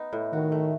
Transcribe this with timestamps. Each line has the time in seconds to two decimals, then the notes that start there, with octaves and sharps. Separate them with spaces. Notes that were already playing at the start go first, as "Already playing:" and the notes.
Already playing: B3 D#4
0.13 A2
0.33 D#3 F#4
0.52 A3